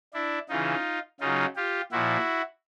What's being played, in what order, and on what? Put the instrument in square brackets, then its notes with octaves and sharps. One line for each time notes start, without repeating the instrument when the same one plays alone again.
[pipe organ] D4 E4
C#3 E3 D#4 F4
C#3 F#3 D#4 F4
F4 G4
A#2 F3 E4 F#4